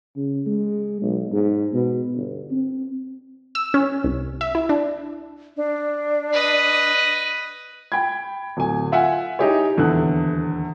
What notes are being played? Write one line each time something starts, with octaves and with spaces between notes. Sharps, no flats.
C#3
G#3
B1
G#2
B2
G1
C4
E6
C#4
C2
E5
E4
D4
D4
B4 D#5
G5 B5 G#6
D1 G#5
F4 E5 F#5 G#5
D#4 E4 G4 G#4 C#5
D#1 E2 D3 A4 F#6